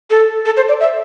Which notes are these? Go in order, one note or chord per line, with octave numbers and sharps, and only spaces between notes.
A4
A4
C5
D5
E5